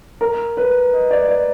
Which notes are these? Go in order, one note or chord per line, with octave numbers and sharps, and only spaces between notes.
A#4
B4
D#5
D5
D5